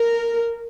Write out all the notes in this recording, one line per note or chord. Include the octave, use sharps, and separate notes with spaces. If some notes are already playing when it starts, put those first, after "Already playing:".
Already playing: A#4